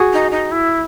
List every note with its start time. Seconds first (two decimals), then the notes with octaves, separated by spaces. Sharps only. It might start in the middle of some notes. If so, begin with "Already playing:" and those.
Already playing: F#4 G#4
0.13 D#4
0.31 D#4
0.51 E4